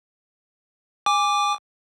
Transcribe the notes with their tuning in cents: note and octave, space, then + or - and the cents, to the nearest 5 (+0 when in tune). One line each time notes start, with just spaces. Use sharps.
G#5 -20 D6 +0